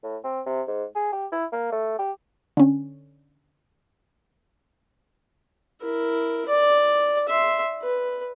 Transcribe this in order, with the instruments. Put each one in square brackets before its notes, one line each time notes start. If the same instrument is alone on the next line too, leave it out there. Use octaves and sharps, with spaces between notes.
[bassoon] A2
C4
C3
G#2
G#4
G4
E4
A#3
A3
G4
[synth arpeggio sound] D3 C#4
[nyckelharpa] E4 A#4
D5
E5 C6
B4